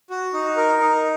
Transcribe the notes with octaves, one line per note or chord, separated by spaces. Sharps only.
F#4
D#4
A#4
D#4